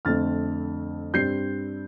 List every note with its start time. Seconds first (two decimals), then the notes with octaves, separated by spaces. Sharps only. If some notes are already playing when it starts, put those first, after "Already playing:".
0.05 F2 D3 A3 C4 F6 A6
1.14 G2 G3 C4 G6 C7